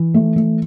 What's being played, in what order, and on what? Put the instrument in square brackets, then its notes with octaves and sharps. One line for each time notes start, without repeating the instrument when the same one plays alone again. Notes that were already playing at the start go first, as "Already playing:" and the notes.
Already playing: [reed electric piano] E3
[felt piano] A3
A3